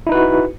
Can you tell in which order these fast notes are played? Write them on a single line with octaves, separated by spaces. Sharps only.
E4 D#4 B4 F#4